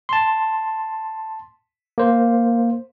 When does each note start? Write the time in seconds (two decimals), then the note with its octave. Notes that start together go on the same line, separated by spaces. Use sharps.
0.09 A5 C6
1.98 A#3 C5